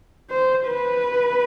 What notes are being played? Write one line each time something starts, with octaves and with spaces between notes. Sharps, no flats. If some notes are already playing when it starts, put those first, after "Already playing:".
C5
B4